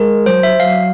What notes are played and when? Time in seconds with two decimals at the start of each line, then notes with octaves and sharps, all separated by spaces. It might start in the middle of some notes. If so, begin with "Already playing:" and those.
Already playing: G#3 A#4
0.26 F#3 C5
0.43 E5
0.60 F#3 F5